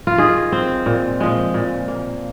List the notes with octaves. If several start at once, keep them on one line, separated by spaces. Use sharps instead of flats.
F4
D#3 G#4
C4
A#2
F3 G#3
A#2
A#3